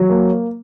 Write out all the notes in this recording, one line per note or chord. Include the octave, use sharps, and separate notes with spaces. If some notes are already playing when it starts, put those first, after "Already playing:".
Already playing: F#3
A#3